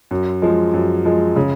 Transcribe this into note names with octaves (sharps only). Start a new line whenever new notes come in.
F#2
F3 G#3
F#2
F3 G#3
C#3